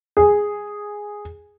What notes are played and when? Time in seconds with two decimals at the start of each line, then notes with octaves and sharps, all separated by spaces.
0.17 G#4